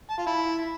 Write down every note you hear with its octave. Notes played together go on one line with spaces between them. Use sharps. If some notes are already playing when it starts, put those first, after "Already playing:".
A5
F4
E4